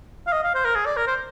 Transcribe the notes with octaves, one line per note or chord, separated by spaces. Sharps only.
F5
D#5
F5
C5
A#4
G#4
D5
A#4
C5